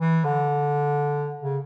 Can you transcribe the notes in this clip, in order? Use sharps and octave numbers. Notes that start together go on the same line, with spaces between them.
E3
D3
C#3